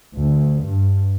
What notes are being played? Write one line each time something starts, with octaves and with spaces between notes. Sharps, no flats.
D2
G2